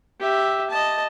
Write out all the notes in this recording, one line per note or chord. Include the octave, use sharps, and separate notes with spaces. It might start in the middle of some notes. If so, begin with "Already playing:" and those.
G4 E5
D#5 A5